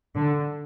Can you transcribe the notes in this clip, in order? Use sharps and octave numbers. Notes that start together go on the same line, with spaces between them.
D3